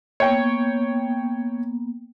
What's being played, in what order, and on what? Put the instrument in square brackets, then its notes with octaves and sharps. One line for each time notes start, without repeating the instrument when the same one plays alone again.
[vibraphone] A#3 B3 [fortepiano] C#5 G5